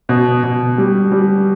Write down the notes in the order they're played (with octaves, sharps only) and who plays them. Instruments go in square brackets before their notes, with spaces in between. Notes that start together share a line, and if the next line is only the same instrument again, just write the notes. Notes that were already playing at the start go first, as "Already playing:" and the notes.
[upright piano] B2
B2
G3
G3